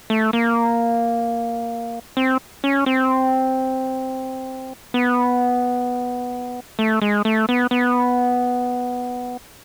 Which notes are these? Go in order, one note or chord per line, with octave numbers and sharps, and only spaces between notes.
A3
A#3
C4
C#4
C4
B3
A3
G#3
A3
B3
B3